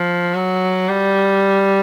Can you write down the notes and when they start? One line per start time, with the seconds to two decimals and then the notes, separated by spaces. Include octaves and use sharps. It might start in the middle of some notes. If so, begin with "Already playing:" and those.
Already playing: F3
0.34 F#3
0.88 G3